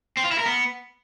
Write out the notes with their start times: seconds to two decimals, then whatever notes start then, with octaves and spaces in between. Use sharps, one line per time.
0.17 C4
0.24 F4
0.31 E4
0.39 A#4
0.46 B3